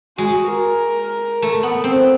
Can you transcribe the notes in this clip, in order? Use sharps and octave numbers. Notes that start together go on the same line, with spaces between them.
G#3 F#4
A#4
A3
B3
C4